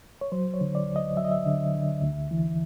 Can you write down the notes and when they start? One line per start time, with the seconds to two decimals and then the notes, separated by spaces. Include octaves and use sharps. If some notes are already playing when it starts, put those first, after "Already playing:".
0.21 C#5
0.32 F#3 C5
0.54 C#5
0.61 D3
0.75 D5
0.89 D2
0.96 D#5
1.17 F#3 E5
1.25 D#5
1.32 E5
1.46 D3
1.74 D3
2.02 D2
2.31 E3